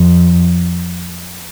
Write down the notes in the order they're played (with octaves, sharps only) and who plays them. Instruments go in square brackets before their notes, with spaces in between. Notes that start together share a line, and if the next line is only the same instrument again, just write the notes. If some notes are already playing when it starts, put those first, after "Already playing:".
Already playing: [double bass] F2